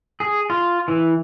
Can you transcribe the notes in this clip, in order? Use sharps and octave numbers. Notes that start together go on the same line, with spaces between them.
G#4
F4
E3